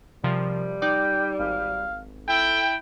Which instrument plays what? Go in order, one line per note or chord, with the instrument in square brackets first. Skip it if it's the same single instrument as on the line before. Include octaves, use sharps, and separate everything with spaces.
[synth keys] C3 F3 A#4 [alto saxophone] G3
[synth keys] D#4 D5 D6 [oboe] G5
[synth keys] G#1 [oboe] F5
[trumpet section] E4 G5 [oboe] A4